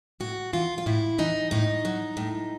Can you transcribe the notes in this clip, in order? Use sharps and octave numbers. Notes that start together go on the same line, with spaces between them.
A2 F#4
E3 F4
F4
A2 E4
E3 D#4
A2 D#4
F#3
A2